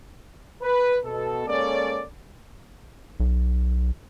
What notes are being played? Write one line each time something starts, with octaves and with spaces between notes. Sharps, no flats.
B4
B2 A4
G#3 A#3 C#4 A4 C#5 D5
B1